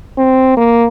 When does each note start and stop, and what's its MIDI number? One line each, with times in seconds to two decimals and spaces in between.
0.18 0.56 60
0.57 0.87 58